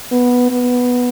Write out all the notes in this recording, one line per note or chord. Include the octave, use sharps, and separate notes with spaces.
B3
B3